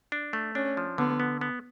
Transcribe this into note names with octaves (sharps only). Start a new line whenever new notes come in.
D4
A3
C#4 D4
F3
D3 B3
B3
B3